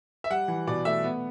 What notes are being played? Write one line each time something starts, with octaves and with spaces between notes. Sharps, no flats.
E5
G3 F#5
E3
B2 D5
A3 E5
B3